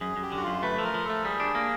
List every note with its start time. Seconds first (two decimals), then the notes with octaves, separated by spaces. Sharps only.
0.01 F#2 G#4
0.17 F#2
0.22 G4
0.32 D3 F#4
0.42 F#2 F4
0.63 A3 B4
0.78 F3 A4
0.84 A#4
0.94 F3
1.04 A4
1.10 A3
1.25 G3 G#4
1.40 D4
1.55 A#3